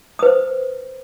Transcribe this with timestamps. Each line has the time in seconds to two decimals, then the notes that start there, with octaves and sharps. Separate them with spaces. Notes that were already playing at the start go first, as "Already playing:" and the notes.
0.19 D#6
0.23 B4
0.26 C5